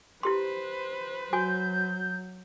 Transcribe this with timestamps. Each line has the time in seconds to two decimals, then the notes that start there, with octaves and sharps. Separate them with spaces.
0.23 E4 G4 B4 C5 C6
1.33 F#3 F#4 G#5 G6